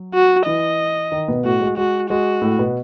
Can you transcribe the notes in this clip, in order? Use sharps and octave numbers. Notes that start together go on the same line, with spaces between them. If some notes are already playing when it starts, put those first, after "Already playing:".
Already playing: F#3
F#4
E3 E4 D#5
D#3 D#4
B2 B3
A2 A3 F#4
G#3
G#3 F#4
G#3 F#4
A2 A3
B2 B3